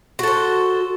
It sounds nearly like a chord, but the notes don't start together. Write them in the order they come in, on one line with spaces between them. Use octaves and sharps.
F#4 A4 C5